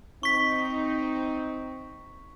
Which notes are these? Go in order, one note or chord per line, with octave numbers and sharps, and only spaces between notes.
C4 D#4 C#6 B6